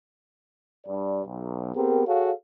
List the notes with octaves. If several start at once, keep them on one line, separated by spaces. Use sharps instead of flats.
G2 D5
B1
B3 C4 G4 G#4 A#4
F#4 G#4 A4 C#5 F5